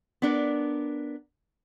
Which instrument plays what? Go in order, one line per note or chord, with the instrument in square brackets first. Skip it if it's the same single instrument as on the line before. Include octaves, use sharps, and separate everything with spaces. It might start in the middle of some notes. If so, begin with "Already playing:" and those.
[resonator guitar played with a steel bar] B3 D4 A#4